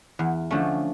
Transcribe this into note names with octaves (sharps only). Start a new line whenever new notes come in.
E2
D3 F3 A3 C#4